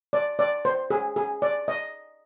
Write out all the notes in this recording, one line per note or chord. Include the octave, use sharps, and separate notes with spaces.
D5
D5
C5
G#4
G#4
D5
D#5